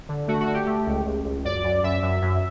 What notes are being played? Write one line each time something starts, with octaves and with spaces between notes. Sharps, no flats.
D3
A3 F#4
F#4
D3
G4
A3
C#2
C#2
C#2
F#2 D5
F#2
F#2 E5
F#2
F#2